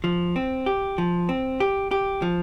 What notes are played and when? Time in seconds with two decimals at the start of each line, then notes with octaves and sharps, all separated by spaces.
0.04 F3
0.36 C4
0.66 G4
0.98 F3
1.29 C4
1.60 G4
1.91 G4
2.22 F3